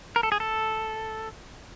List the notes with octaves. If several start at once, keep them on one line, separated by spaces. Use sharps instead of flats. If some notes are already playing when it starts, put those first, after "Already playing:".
A#4
A4
G#4
A4